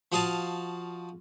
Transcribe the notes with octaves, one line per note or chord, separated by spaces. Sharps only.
F3 F#4 D#5 F5 A5